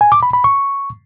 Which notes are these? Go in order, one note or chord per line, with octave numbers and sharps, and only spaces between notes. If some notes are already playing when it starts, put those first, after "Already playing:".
G#5
D6
B5
B5
C#6